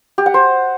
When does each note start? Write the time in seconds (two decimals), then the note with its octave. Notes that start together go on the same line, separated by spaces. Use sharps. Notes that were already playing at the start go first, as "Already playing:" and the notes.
0.18 G4
0.26 F#5
0.34 C5